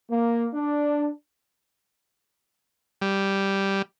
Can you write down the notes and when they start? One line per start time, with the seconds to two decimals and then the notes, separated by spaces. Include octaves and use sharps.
0.11 A#3
0.54 D4
3.02 G3